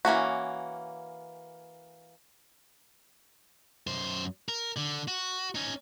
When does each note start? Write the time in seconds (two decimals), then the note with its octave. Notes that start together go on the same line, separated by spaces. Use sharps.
0.05 E3 A#3 C#4 F#4
3.87 F#2 C5
4.49 A#4
4.77 D3
5.08 F#4
5.55 C#4 D#4